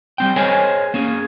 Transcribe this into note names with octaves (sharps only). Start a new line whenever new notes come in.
G3 C4 G5
G#4 A#4 C5 C#5 D#5 G#5
A#3 C#4 G#4